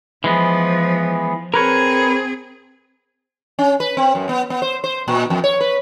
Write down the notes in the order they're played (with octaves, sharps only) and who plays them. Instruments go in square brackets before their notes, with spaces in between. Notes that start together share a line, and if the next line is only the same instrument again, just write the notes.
[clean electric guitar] E3 G#3 B3 [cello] F3
[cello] C4 G#4 [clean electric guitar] A#4 B4 C#5
[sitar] C#4
B4
C4
F#2
B3
B3
C5
C5
A#2
F2
C#5
B4